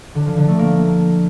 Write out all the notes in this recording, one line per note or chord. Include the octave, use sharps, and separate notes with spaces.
D3
F3
D3
A3
A#3